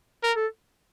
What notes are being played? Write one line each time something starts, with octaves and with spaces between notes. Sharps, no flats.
A#4
A4